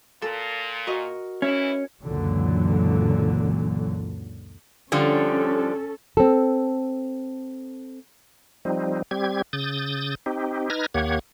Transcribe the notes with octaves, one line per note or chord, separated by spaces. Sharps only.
A#2 A4
F#4 A#4 D#5
E3 C#4 E4
C#2 F#2 A#2 D3 E3 F#3
D3 F3 G3 C#4 A4
C4 A4
F3 G3 C4 D#4
G3 C4 G4 G#6
C#3 D#6 G6 A6
C4 D#4 G4
D#4 B4 F6 G#6 A#6
D#2 A#3 G4 C#5 F#5 G#6